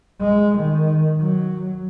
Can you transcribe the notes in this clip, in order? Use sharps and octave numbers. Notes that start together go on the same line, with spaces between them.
G#3
D#3
F#3